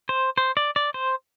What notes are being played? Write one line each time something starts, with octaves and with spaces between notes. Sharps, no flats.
C5
C5
D5
D5
C5